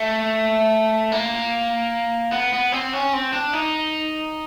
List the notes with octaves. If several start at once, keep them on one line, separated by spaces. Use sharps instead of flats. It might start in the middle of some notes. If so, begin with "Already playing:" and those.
Already playing: A3
A#3
B3
B3
C4
C#4
C4
D4
D#4